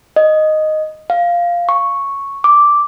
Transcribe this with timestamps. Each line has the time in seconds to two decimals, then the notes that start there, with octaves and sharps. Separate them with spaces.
0.16 D#5
1.10 F5
1.69 C#6
2.44 D6